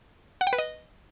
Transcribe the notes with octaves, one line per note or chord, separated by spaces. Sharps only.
F#5
G5
B4
D#5